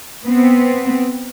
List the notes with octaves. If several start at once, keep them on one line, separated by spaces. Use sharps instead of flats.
B3 C4